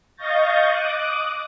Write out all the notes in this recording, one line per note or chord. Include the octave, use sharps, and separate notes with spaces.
D#5 F5 C#6 G6 A6 A#6
D6 D#6 F#6